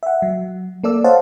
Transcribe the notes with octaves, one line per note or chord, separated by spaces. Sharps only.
E5 F#5
F#3
A#3 A4 D5 E6
C5 C#5 D#5 F5 F#5 A5